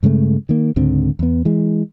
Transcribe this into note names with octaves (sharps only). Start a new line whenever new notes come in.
G2 C#3 G#3 A3
D#3 A#3
C#2 G#2 D3 C4
E2 B3
E3 G#3